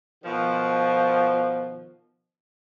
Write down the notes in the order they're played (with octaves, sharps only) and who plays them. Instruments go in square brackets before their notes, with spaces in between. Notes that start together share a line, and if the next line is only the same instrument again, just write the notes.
[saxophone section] B2 D#3 F3